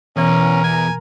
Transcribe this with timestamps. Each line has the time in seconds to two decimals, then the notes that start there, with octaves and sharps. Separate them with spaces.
0.17 E2 B2 E3 C#4 A#4
0.64 G#5